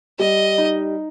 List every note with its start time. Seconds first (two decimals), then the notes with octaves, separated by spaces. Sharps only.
0.19 G3 D#5
0.58 D#4